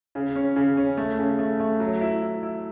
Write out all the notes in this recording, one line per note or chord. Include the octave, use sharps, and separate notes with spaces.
C#3
C#4
C#3
C#4
A3
C#3
A3
A3
F#3
E4
E4
E4